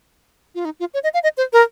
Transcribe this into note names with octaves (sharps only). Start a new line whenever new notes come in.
F4
D#4
F4
C#5
D#5
F5
D#5
C5
A#4